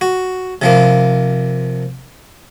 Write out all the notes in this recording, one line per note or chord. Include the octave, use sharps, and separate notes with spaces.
F#4
C3 F3 A#3